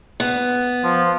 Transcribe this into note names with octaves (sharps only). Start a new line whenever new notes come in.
B3
F3